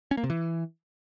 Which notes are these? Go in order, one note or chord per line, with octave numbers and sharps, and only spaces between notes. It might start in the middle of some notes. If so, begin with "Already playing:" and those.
C#4
A#3
C3
E3